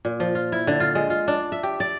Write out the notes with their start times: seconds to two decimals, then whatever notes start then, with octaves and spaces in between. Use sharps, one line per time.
0.05 A#2
0.20 F3
0.35 F4
0.52 E4
0.67 D3
0.80 F4
0.95 G#3
1.10 F4
1.28 D4
1.52 E5
1.63 G4
1.80 D5